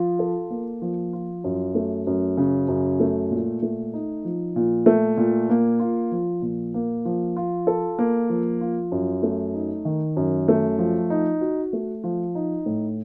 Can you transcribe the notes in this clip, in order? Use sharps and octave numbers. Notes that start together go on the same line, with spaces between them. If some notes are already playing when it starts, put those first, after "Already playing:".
Already playing: F3 F4
A4
A#3
F3
F4
F#2
A3
F#2
C#3
F#2
A3
A#2
A3
D#4
F3
A#2
A3
A#2
A#3
F4
F3
A#2
A#3
F3
F4
A4
A#3
F3
F4
F#2
A3
D#4
D#3
F#2
A3
F3
D#4
F#4
A3
F3
D#4
A2